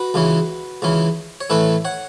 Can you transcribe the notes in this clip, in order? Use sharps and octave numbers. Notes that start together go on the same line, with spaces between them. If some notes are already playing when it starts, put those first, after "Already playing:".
Already playing: F#4 B4
C#2 C#3 E3 C#4
C#2 C#3 E3 C#4
C#5
A2 E3 A3 C#4 B4 E5
C#5 F#5